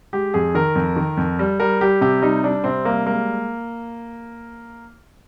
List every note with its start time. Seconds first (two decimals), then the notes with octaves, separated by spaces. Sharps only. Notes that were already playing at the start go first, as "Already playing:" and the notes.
0.13 G#3 G4
0.34 F2 G#4
0.55 D#3 A#4
0.75 F2
0.96 D#3
1.17 F2
1.39 G3
1.60 G3 A#4
1.81 G3 G4
2.01 C3 G4
2.22 G3 D#4
2.43 G3 D4
2.64 C3 C4
2.85 G3 A#3
3.06 G#3 A#3